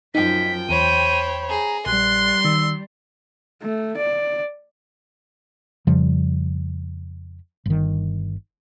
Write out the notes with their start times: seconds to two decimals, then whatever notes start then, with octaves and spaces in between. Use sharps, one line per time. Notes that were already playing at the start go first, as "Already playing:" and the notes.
0.15 F#2 F3 D#4 G5 B6
0.69 E2 C5 C#5 B5 D#7
1.49 G#4 A#5
1.86 A#1 G3 C6 F#6
2.44 D#3 E6
3.62 A3
3.98 D5
5.87 F2 C#3 F3 G3
7.66 G1 D#3